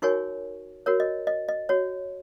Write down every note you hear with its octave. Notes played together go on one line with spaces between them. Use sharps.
D#4 F#4 A#4 C#5 G#5 C#6
F#4 A#4 C#5
D#5
D#5
D#5
F#4 C#5